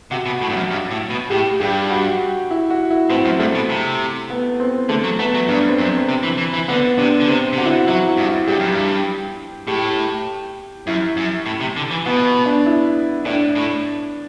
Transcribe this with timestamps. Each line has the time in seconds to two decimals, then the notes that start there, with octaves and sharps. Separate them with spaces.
0.11 C3 F#4
0.26 B2
0.41 A2
0.50 G2
0.56 F#2
0.71 G2
0.91 A2
1.10 B2
1.30 A2 G4
1.60 G2 G4
1.90 F#4
2.51 E4
2.70 F#4
2.91 E4
3.10 A2 C4
3.25 F#2
3.39 G2 A3
3.55 B2
3.70 C3
4.30 B3
4.60 C4
4.89 D3 A3
5.04 F#3
5.19 A3 B3
5.34 F#3
5.48 G2 D4
5.68 C4
5.78 F#2
5.89 C4
6.09 C3
6.23 E3
6.38 E3
6.54 E3
6.68 D3 B3
6.98 C3 D4
7.20 D3
7.28 C3 C4
7.53 C3
7.57 D3 F#4
7.65 E4
7.72 F#4
7.88 F#3 E4
8.08 E4
8.17 G2
8.27 E4
8.47 G2 G4
8.59 F#2
8.72 G2
9.67 A2 G4
10.87 F#2 E4
11.17 F#2
11.46 A2
11.61 C3
11.77 D3
11.91 E3
12.06 B2 B3
12.46 D4
12.66 E4
13.25 A2 D4
13.55 A2